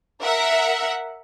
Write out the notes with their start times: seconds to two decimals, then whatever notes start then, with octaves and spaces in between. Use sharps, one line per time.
0.22 A#4 E5 F#5